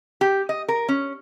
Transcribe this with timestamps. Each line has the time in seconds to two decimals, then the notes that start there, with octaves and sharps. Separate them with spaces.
0.21 G4
0.49 D#5
0.68 A#4
0.88 C#4